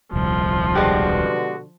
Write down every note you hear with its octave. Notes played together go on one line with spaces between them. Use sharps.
D#1 C2 F3
B2 D3 G#3 F#4 G4